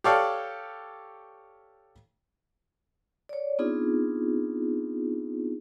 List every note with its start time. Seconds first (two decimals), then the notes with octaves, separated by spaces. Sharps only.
0.04 G4 A4 C#5 D5 F5
3.29 C#5 D5
3.59 B3 C4 D4 D#4 F4 G#4